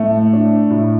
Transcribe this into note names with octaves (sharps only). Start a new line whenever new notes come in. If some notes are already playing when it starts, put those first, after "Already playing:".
Already playing: A2 A3
D4
A2